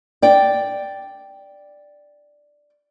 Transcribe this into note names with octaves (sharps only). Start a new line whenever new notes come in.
D5 G5